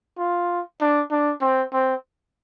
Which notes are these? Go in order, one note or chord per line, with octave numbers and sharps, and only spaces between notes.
F4
D4
D4
C4
C4